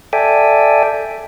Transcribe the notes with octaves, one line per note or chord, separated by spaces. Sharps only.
A4 D5 E5 G5 G#5